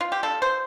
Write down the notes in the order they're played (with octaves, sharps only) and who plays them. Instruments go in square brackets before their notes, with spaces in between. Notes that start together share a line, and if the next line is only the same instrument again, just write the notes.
[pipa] F4
G4
G3 D4 F4 A4
C5